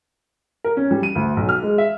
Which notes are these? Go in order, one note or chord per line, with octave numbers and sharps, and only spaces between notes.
A#4
C#4
G3
D#7
D2
B1
F6
G#3
E5